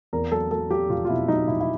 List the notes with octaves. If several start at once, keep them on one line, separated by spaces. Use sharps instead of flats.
E2 A#4
F#3 A4
F#3 A4
F#3 G4
F1 F4
F4
B2 E4
F#3 D#4
F1 E4
E4